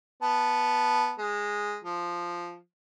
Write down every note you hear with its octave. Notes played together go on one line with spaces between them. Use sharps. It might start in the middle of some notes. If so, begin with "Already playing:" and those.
B3 A5
G#3
F3